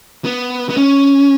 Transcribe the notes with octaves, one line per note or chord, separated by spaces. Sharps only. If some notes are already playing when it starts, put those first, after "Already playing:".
B3
B3
C#4